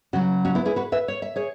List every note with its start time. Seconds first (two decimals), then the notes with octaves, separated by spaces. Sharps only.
0.13 C#3 F#3 C#4 F#4
0.45 C#4 F#4
0.55 B3 E4
0.65 E4 G#4
0.76 F#4 B4
0.92 B4 E5
1.08 C#5
1.22 E5
1.36 G#4 C#5